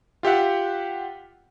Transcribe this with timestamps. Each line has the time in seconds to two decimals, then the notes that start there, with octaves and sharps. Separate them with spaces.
0.23 F4 G4 E5 F#5